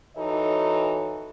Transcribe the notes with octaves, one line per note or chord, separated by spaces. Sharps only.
E3 D#4 F#4 A4 C#5 D#5